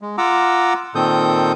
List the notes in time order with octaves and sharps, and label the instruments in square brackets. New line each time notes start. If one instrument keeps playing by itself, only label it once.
[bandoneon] G#3
F4 F#5 A#5 D6 E6
A#2 D#3 C4 A4 D#6 G6